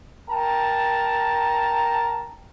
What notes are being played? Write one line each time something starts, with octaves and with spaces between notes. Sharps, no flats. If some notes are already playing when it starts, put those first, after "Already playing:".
A#4 G5 A5 A#5